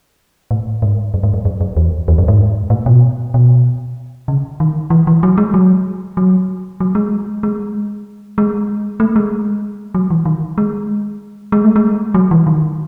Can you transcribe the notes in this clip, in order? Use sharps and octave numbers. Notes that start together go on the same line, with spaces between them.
A2
G#2
F#2
G#2
F#2
F#2
F#2
E2
E2
F#2
G#2
A2
B2
B2
C#3
D#3
E3
E3
F#3
G#3
F#3
F#3
F#3
G#3
G#3
G#3
A3
G#3
F#3
E3
D#3
G#3
G#3
A3
G#3
F#3
E3
D#3